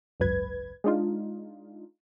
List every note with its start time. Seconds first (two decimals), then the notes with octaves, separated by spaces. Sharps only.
0.20 G#1 C#2 F#2 B4 G#6
0.84 G#3 D4 D#4 F4